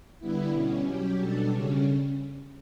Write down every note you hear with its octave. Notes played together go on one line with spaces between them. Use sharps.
D3 G3 B3 E4
B2 G3 C#4
F#3 C#4 G4
B2 G3 D4 A4
C#3 G3 C#4